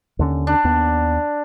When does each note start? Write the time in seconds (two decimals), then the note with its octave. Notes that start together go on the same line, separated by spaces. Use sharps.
0.19 D#2 D3 C#4
0.47 D4
0.64 D#2 B3